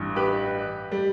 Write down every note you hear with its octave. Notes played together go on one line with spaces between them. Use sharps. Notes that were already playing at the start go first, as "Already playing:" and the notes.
Already playing: A1 G2 E3
G4 B4
G3